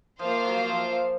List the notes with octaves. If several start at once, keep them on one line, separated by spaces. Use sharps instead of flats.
F3 A#3 F4 C5 F5
F#3
F3